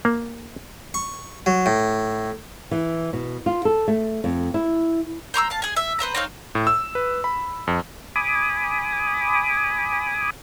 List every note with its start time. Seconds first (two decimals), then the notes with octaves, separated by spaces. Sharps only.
0.05 A#3
0.94 C#6
1.46 F#3
1.66 A2
2.71 E3
3.13 B2
3.46 F4
3.65 A4
3.88 A3
4.24 F2
4.54 E4
5.34 C5 A#5 C#6 E6
5.50 F5 A5
5.62 G#4 G#5
5.76 E5
5.99 B4 C5 E5 A#5
6.15 C4 D#4 C#5 F5
6.55 A2
6.67 E6
6.95 B4
7.24 B5
7.67 F2
8.16 G#5 B5 D6 D#6